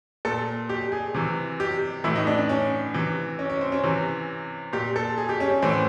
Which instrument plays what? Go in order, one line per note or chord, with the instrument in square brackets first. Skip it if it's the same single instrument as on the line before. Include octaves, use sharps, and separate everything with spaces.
[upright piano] A#2 A4
G4
G#4
C3 E3
G4
A2 E3 E4
D#4
D4
D4
C#4
C3 E3
C#4
C#4
C4
C#4
C3 E3
A#2 G4
A4
G#4
G4
C#4
C#4
A2 E3 C4